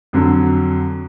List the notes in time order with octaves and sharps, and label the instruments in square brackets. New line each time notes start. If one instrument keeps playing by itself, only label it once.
[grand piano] F2 D3 F#3